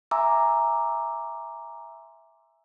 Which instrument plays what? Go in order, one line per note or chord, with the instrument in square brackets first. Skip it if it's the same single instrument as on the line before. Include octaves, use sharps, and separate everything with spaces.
[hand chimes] E5 G#5 A#5 C6 D6 E6